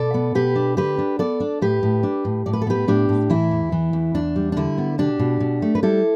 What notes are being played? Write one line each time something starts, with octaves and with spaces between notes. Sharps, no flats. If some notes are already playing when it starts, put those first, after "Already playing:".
Already playing: B2 A4 D5
B3
B2 G4 B4
D4
D3 G4 B4
D4
B3 A4 D5
D4
A2 G4 B4
A2
D4
A2
A2 D5
B4
A4
B3 G4 B4
A2 D4 G4
A2
E3 E4
E2
E3
E2
E2 D4
G3
D4
D3 E4
B3
B2 D4 G4
B2
B2
A3
B4
G3 E4 A4